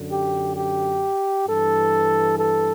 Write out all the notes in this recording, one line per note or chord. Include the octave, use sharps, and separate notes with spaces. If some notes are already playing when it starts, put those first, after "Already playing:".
Already playing: F#2 D3
G4
G4
G2 E3 A4
A4